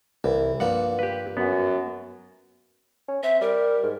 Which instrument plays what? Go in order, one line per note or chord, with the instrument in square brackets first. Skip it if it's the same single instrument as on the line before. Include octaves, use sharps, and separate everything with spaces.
[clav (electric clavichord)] C2 [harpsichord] E3
[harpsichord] G2 F3 A#3 [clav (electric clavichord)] F#5
[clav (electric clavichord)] G4 B4
[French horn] F#2 [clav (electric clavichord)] B3
[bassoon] C#4
[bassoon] C4 [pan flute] E5
[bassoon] G3 [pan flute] A#4
[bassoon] G#2